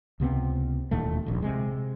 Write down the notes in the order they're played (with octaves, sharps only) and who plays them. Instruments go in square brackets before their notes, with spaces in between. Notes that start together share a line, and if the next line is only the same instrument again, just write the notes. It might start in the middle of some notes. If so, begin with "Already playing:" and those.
[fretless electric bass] C#2 C3 B3 C4
E1 D#2 A#2 A3
D#1 A#1
C3 G#3